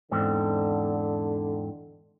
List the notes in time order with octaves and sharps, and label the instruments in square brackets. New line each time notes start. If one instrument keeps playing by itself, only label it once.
[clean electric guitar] E2 G#2 C4 [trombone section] D3